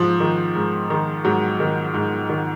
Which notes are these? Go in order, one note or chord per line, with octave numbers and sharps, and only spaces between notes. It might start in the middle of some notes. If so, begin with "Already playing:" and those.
Already playing: G#2 F3
D#3
G#2
D#3
G#2 F#3
D#3
G#2
D#3